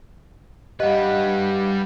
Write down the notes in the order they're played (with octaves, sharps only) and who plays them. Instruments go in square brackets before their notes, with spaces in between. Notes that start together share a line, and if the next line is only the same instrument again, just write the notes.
[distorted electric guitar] G3 B4 [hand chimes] G4 F5 F#5 [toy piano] D#5